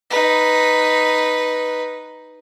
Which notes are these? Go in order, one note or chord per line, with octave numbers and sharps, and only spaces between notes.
D#4 B4